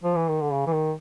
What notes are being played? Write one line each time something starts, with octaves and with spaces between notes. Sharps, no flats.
F3
E3
D#3
D3
C#3
E3
D#3